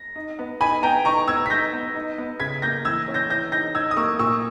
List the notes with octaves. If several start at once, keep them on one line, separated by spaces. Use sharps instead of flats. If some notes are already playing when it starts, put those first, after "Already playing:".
Already playing: A#6
D#4
B3
D#4 G#5 B5
B3 G5 A#5
D#4 A#5 C#6
B3 E6 G#6
B6
D#4 G6 A#6
B3
D#4
B3
C#3 G#6 B6
A#3 G6 A#6
E3 E6 G#6
C#4
G6 A#6
E3 G6 A#6
D#4 G6 A#6
D#4 E6 G#6
D#6
A#3 C#6 E6
A#2 C#6 E6